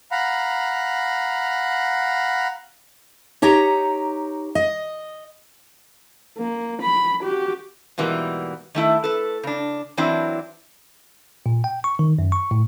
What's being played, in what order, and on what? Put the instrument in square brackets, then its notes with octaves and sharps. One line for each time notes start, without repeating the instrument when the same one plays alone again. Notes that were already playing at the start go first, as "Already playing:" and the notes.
[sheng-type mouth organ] F5 F#5 A#5 B5
[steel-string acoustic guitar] D#4 G4 C#5 A#5
D#5
[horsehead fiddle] A#3
B5
F#4 G4
[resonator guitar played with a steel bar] G#2 B2 E3 G3 A#3
D#3 A3 E4
A4 B4
C#3 D4
E3 F#3 C4 D4 E4
[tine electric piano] A#2
G5
C#6
D#3
F#2
C#6
A2